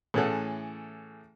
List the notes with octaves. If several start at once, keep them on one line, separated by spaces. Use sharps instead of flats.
A2 E3 C#4 G#4 A4 F#5